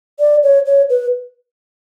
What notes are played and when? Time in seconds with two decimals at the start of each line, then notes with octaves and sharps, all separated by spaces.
0.20 D5
0.43 C#5
0.66 C#5
0.90 B4